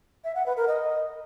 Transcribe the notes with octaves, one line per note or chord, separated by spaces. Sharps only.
E5
F#5
B4
A#4
D#5